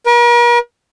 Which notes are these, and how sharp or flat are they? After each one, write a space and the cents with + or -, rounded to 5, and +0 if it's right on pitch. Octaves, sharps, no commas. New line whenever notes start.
A#4 +45